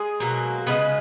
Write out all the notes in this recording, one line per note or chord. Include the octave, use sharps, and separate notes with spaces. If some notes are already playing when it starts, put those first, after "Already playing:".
Already playing: G#3 G#4
B2 F#3 A#3
C#3 G#3 B3 B4